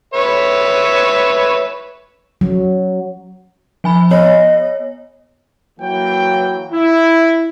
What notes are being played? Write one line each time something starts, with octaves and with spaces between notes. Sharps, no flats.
B4 C#5 E5
F#3
F3 G#5 B5
B3 C#5 D#5
E3 F#3 A#3 G5
E4